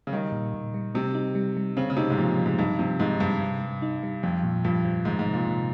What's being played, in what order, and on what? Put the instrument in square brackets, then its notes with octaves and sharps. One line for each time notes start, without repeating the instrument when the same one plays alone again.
[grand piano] C#3
[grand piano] D#3 [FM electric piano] G3
[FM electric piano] A#2
A#2
G3
[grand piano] C3 [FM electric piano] G3
[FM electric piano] D#4
G3
G3
[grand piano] C#3 [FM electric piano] C4
[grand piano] C#3
[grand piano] C3 [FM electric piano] D#4
[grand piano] G#2
[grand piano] A#2 [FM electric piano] F3
[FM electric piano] F3
[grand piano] G#2
[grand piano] G2 [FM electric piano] D#4
[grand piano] C3 [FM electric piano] F3
[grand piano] G#2 [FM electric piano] D#4
[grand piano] G2 [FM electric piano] G#3
[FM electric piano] C3
G3
D#4
G3
[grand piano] F2 [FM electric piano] F3
[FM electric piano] A#2
[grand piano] G2 [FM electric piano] F3
[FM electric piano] F3
[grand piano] G#2 [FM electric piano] D#3
[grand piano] G#2
[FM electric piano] C3
[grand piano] A#2
[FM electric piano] C3